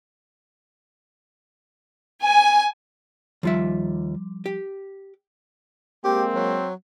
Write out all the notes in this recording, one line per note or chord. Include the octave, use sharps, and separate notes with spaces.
G#5
D#2 F3 G3 F4 E5
G4
G#3 A#3 C4 G4
F#3